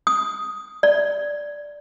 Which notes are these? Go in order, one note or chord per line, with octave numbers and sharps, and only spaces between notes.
D#6
D5